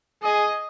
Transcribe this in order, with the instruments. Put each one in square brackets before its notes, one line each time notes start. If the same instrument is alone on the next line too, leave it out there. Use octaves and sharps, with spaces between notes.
[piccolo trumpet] G#4 [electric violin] D#5